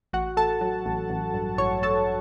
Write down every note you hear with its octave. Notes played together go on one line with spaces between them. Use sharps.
A1 F#4 F#5
A1 A4 A5
F#3
A1
A1
G2
A1 C#5 C#6
A1 A4 A5